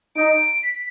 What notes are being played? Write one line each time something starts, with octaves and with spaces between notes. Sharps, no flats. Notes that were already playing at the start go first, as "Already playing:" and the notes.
D#4 D7
B6